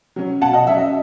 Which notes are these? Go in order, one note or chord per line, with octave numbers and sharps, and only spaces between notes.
F#3 C#4
B2 F#5 A5
D#5 F#5
F#3 C#4 E5
D#5